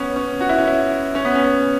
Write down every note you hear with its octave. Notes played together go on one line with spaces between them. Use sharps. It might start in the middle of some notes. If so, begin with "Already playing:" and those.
Already playing: B3 C#4
C#4
F#4
E4
C#4
E4
C#4
B3
C#4